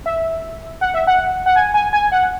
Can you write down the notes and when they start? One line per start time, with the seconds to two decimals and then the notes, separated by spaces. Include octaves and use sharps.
0.06 E5
0.81 F#5
0.94 E5
1.07 F#5
1.46 F#5
1.56 G#5
1.74 G#5
1.93 G#5
2.12 F#5